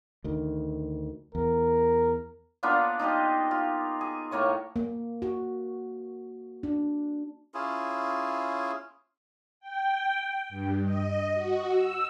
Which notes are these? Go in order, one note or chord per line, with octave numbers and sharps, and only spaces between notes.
D2 D#3
E2 A#4
A#3 B3 D4 F4
D#4 F4 G4 D#5
F4
G#4
A2 A#3 C#5 C#6
A#3
F#4
D4
C#4 E4 F4 G#4
G5
G2
D#5
F#4
E6